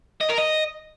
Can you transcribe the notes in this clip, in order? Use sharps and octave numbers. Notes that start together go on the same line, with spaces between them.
D#5
A#4
D#5